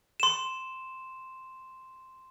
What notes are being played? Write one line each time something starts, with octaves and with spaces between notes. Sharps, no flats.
C6 E7